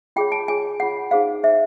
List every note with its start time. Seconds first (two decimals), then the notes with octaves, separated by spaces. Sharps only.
0.16 F4 G#4 C#5 G5
0.32 A5
0.48 F4 G#4 C#5 G#5
0.80 F4 G#4 C#5 F#5
1.11 D#4 G#4 C5 F5
1.43 D#4 G#4 C5 E5